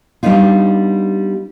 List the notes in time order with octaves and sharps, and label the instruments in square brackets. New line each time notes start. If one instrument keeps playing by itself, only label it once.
[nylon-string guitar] G3 B3 D4 D#4 F4